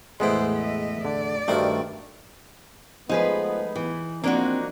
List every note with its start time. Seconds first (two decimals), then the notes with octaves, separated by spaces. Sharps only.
0.20 E2 A2 G#3 B3 E4 C5 G5
0.56 D#5 E5
1.05 D3 D5
1.48 G2 D#3 A3 F#4 C5 F5
3.09 F3 G#3 A3 B3 D#4 G#4 B4
3.76 E3
4.24 F3 A#3 C4 D4 D#4 F#4